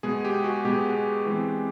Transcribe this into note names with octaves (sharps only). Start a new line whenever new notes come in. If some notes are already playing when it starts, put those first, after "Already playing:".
B2 G#3 B3 G#4
G4
F#4
B2 G#3 B3 G4
E3 G#3 C4